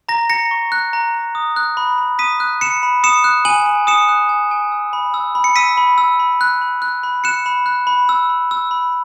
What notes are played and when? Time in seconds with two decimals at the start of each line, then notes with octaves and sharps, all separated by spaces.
0.09 A#5 A#6
0.30 A#5 A#6 C#7
0.51 C#6
0.72 F#6
0.93 A#5
1.15 A#5
1.35 D#6
1.56 F#6
1.77 B5
1.98 B5
2.19 D#6 B6 D#7
2.40 F#6
2.61 B5 C#7 E7
2.83 B5
3.04 D#6 C#7 E7
3.24 F#6
3.45 G#5 D#7 F#7
3.66 G#5
3.87 D#6 C#7 E7
4.09 F#6
4.29 G#5
4.51 G#5
4.72 E6
4.93 B5
5.14 E6
5.35 B5
5.44 C#7
5.56 E6 B6 D#7
5.77 B5
5.98 E6
6.20 B5
6.41 F#6
6.61 B5
6.82 F#6
7.03 B5
7.24 F#6 C#7 E7
7.46 B5
7.66 F#6
7.87 B5
8.09 E6
8.29 B5
8.51 E6
8.71 B5